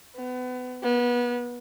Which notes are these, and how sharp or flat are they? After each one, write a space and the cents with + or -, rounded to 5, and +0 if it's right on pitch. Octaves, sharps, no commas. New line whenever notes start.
B3 +30
B3 -25